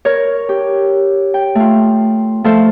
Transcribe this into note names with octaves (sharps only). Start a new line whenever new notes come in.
A#4 C#5
G4
G5
A3 F4
F3 A3 A4 C5